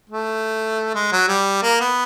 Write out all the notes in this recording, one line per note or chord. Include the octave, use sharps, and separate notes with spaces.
A3
G#3
F#3
G3
A#3
B3